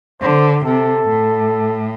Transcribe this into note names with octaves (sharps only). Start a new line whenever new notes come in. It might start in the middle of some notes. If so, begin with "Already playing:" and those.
D3 C5
C3 A4
A2